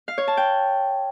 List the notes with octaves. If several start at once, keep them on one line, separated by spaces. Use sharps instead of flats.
F5
C#5
A5
G5